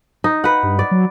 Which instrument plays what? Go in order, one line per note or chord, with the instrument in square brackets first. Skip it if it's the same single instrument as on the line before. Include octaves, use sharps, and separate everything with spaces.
[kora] D#4
B4 F#5
[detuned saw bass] G2
[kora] D5
[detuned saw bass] F#3